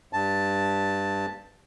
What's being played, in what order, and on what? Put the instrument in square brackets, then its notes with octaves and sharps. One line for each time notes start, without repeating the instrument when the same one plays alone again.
[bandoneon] G2 A5